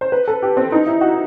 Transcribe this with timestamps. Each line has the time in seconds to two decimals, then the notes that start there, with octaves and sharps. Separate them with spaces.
0.01 C5
0.12 B4
0.28 A4
0.42 G4
0.57 C4
0.72 D#4
0.87 E4
1.01 F#4